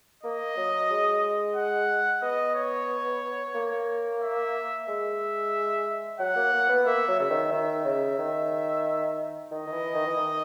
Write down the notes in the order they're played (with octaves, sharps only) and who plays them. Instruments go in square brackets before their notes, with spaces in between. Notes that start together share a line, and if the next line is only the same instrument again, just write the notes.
[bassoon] A#3 [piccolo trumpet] D#5
[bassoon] F#3
G#3
[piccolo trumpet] F#5
[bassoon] B3 [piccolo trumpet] D#5
[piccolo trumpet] C#5
[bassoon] A#3
[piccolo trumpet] E5
[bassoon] G#3 [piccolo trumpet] E5
[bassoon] F#3 [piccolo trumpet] F#5
[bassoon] A#3
A#3
B3
[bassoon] A#3 [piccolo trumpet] E5
[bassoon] F#3
[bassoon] C#3 [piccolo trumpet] E5
[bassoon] D#3
[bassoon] D#3 [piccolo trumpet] E5
[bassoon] C#3
D#3
[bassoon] D#3 [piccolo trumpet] D#5
[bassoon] D#3
E3
D#3
E3
D#3